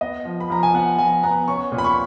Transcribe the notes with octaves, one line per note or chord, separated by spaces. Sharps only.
B3 D#5
F3
B5
F3 A#5
G#5
B3 F#5
F3 G#5
B3 A#5
C#4 C#6
A#2
B5
C#6